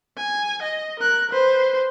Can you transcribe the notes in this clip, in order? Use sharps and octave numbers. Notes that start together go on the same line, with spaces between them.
G#5
D#5
A#4 F#6
B4 C5